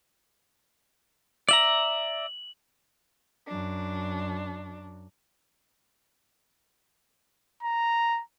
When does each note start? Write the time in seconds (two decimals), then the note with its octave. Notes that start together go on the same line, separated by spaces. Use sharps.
1.49 D5 E5 A#5 F#7
3.48 F#2 D4
7.63 A#5